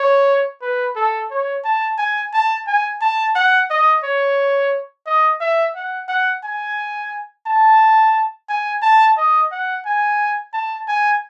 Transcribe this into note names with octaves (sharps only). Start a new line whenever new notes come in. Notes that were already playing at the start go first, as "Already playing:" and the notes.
Already playing: C#5
B4
A4
C#5
A5
G#5
A5
G#5
A5
F#5
D#5
C#5
D#5
E5
F#5
F#5
G#5
A5
G#5
A5
D#5
F#5
G#5
A5
G#5